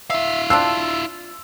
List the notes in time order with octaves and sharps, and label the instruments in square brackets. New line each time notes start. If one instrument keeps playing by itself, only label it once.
[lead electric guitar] E4 F5 [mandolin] E5
[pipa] F3 C4 D4 [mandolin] F4 [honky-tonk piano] E6